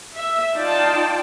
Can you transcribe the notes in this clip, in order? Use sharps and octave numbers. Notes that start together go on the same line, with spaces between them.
E5
D#4 F4 D5 G5 A5